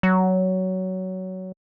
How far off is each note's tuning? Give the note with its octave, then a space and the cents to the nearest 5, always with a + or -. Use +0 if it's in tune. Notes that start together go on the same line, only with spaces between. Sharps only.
F#3 +15